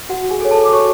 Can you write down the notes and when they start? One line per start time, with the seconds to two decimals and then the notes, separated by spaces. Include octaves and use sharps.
0.09 F#4 F#5
0.31 G#4 G#5
0.41 A4
0.45 C#5
0.51 A4 A5
0.64 D6
0.73 F#4 C#5 C#6